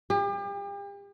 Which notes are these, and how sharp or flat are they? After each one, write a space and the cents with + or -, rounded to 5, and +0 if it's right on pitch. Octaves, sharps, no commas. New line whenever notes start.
G4 +40